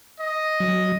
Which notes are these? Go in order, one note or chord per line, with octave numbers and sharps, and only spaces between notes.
D#5
F#3